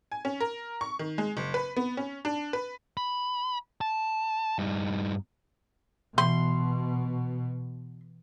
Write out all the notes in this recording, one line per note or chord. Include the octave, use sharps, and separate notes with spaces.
G#5
C#4
A#4
C#6
D#3
G#3
F#1
B4
B3
C#4
D4
B4
B5
A5
G2 D#4
B2 E3 C6